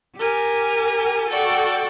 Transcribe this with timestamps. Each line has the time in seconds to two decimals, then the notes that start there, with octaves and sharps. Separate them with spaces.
0.18 G4 A#4 G#5
1.29 F#4 A4 D5 G5